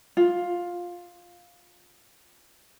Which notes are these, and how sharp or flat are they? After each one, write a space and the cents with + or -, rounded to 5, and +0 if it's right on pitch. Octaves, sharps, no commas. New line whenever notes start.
F4 +10